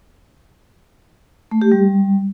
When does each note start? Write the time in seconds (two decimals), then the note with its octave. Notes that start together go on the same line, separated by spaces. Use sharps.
1.51 A3
1.62 G4
1.72 G3